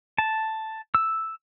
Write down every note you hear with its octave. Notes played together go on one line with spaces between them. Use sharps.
A5
E6